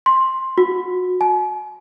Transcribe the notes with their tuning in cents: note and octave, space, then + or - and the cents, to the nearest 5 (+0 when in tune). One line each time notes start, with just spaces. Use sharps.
C6 +10
F#4 -25
G#5 +45